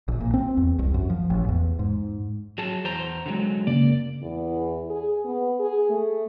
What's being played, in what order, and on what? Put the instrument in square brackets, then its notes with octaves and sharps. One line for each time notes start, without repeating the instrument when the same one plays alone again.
[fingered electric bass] A#1
A#2
C4
E2
C2
F#2
F3
A1
E2
G#2
[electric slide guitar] F#3 G#4 A5
E2 C5 A#5
D3 F#3 G#3
[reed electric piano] F#2 C#3 A#3 [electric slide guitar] D5
[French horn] E2
G#4
B3
G#4
A3